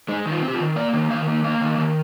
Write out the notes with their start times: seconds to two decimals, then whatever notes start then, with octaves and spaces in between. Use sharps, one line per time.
0.08 G#3 D#4
0.26 D#3
0.31 F4
0.43 C4
0.48 G4
0.54 F4
0.60 D#3
0.76 A#3 D5
0.93 D#3
1.10 D#3 F5
1.27 A#3
1.44 A#3 F5
1.61 D#3
1.78 D#3